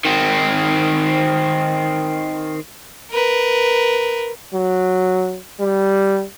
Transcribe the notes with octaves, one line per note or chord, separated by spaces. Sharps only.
D#3 C4
A#4 B4
F#3
G3